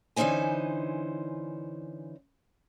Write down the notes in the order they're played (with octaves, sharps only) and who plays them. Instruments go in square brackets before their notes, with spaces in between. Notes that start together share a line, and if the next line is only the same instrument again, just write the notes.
[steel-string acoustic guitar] D3 E3 C#4 D#4 C5 G#5